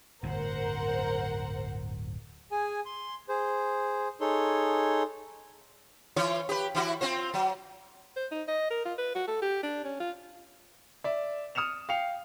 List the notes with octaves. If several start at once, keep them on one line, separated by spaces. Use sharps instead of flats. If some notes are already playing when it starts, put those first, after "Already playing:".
D1 G1 F#2 A#4 C5 F#5
G#4 G#5
C6
G#4 C5
D#4 G#4 A4 C#5 C6
E3 F4 C#5
G4 B4
E3 E4 F#4
C4 F4 C5
F#3
C5
D#4
D#5
A#4
F4
B4
F#4
A4
G4
D4
C#4
F4
D5 E5
D#6 F6 C#7 E7 F7
F5 G5 C7 C#7 F7